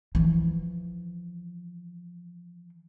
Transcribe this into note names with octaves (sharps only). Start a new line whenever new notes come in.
E3 F3